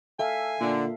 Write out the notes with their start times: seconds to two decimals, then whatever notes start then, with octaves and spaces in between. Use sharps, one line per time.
0.19 A4 E5 F5 G#5
0.60 A#2 D3